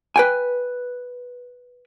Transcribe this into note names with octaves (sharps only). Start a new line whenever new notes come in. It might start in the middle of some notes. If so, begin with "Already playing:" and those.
B4 G5 G#5